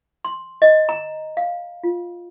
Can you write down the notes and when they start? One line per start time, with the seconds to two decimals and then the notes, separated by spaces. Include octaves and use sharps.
0.25 C6
0.62 D#5
0.89 A#5
1.37 F5
1.84 F4